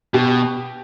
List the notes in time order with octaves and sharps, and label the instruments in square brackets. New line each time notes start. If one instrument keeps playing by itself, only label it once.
[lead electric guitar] B2 [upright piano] G4